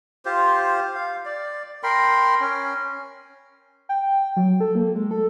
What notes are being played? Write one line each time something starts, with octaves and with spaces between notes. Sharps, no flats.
F4 G4 C5
F5
D5
A#4 G5 B5 C6
C#4
G5
F#3
A4
A#3
G#3
A4